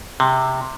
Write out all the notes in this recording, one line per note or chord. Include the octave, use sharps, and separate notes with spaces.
C3